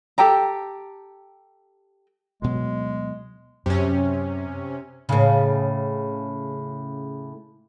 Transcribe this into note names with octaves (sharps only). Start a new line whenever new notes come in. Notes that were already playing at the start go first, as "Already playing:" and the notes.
G4 A4 G5 A#5
D2 B2 F#3 G#3
F#2 C3 C#4
A2 C#3